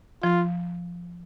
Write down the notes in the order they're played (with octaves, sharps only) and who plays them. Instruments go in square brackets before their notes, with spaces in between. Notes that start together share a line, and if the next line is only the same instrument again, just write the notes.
[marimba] F3 [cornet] F4